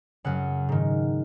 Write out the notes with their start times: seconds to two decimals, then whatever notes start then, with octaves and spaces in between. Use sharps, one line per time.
0.24 F#2 C#3 F#5
0.69 G#2 D#3